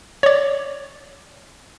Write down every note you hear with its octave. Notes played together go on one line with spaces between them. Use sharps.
C#5 D5